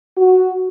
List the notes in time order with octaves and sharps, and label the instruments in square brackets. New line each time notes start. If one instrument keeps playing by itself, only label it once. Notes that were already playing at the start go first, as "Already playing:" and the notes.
[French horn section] F#4